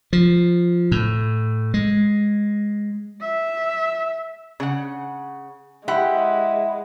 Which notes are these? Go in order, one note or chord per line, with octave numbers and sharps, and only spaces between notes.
F3
A2
G#3
E5
C#3 F#5
G#3 E4 G4 F#5